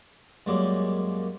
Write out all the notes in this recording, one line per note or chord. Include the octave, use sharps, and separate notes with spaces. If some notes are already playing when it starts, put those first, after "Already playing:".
F#2 G3 G#3 A#3